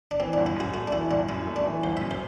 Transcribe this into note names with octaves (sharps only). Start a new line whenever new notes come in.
D4
E3 C4
G1 D4
E4
F#2 F#4
A3 F#4
D4
E3 E4
G1 D4
F#2 E4
A3
D4
E3
G1 C5
F#2 E5
C5